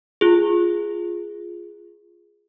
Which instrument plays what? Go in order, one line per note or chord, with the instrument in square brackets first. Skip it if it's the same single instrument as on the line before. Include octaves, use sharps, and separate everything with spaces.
[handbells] F4 G#4